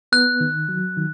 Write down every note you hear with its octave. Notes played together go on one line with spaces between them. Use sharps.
B3 F#6
D#3
F#3
D#3